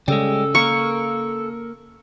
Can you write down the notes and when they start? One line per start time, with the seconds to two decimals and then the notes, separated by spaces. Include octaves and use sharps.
0.08 C#3 G3 G#3 A4
0.55 A#3 A#4 C#6